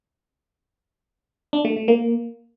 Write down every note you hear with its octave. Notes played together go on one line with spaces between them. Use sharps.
D4
A3
A3
A#3